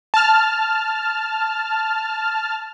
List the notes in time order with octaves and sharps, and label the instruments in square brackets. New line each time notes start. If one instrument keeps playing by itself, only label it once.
[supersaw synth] A5 F6